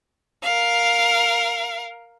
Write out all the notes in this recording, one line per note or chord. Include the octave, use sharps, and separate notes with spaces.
A#4 F5